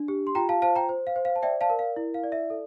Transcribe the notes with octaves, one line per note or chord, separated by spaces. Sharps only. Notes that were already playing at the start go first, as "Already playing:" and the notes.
Already playing: D4
G4
C6
F4 G5 A#5
F5 A5
C5 F5 A5
G5 A#5
C5
F5
C5
F5
A5
D5 E5 G5
F5 A5
A#4
F5
E4
F5
D5
E5
A4